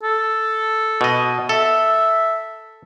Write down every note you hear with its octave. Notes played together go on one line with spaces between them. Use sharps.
A4
B2 D#5
A4 E5